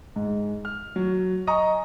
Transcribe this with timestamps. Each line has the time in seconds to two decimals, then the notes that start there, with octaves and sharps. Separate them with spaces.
0.16 G#2
0.65 F6
0.96 F#3
1.47 D#5 G#5 A#5 C#6 D#6